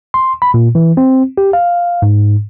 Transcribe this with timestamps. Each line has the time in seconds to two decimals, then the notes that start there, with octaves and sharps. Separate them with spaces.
0.14 C6
0.42 B5
0.54 A#2
0.75 E3
0.97 C4
1.38 G4
1.53 F5
2.02 G#2